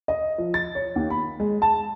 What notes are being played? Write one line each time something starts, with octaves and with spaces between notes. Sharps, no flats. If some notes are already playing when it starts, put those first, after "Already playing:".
D#5
F3
A6
C#5
D#2
B5
G#3
A5